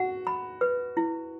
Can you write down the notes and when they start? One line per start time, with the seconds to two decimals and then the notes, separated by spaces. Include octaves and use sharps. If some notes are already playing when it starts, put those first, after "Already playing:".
Already playing: F#4 F#5
0.27 B5
0.61 B4
0.97 E4